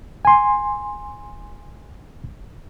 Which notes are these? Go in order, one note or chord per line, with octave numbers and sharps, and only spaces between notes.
G#5 C6